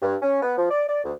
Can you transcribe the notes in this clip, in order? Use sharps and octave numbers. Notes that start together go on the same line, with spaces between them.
G2
C#4
B3
F3
D5
D5
D2